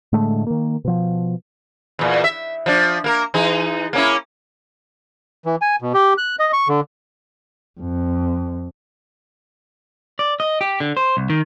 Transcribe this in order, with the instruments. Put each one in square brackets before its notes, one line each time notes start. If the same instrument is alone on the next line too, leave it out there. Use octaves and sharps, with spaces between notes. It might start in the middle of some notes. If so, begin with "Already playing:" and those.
[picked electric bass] A2 D3 G#3 A3
D#3 A#3
B2 F3
[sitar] E2 A#2
E5
F3 D4
A#3 A#4
E3 D#4 G#4
A#3 C#4 E4
[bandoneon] E3
G#5
B2
G4
F#6
D#5
C#6
D3
[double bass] F2
[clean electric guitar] D5
D#5
G4
D3
C5
C2
D#3